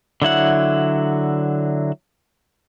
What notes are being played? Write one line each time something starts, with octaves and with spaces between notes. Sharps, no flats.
D3 F#3 E4 F#5